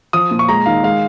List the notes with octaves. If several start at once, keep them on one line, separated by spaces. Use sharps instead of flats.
F3 D#6
A#2
C#6
G#3 A#5
D#3 F5
G#3 F5